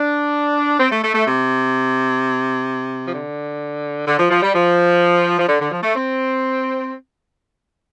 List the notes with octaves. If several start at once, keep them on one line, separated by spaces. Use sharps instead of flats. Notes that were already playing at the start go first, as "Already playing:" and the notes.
Already playing: D4
C4
A3
A3
A3
C3
F3
D3
D3
F3
F3
G3
F3
F3
D3
D3
F3
A3
C4